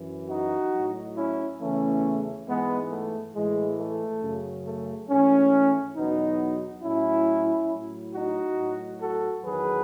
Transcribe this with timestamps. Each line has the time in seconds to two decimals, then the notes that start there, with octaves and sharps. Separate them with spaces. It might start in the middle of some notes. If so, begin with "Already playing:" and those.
Already playing: F#2 E3
0.29 D#4 F#4
0.74 A2 F#3
1.16 C#4 E4
1.60 E2 C#3 E3 A3 C#4
2.48 G#2 E3 G#3 B3
2.91 A3
3.35 A2 E3 G#3
3.78 A3
4.22 F#2 C#3 F#3
4.65 A3
5.09 G#2 E3 A3 C#4
5.96 E2 B2 F#3 B3 D#4
6.83 A2 F#3 C#4 E4
7.71 A2 F#3
8.14 D#4 F#4
8.58 A2 F#3
9.01 F#4 A4
9.45 E2 D#3 F#3 G#4 B4